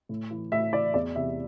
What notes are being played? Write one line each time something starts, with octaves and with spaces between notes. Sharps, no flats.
A2
E3
A2 E5
E3 D5
E2 D5
C3 E3 E5